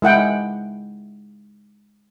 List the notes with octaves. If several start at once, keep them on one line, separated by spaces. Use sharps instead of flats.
G#3 E4 F#5 G5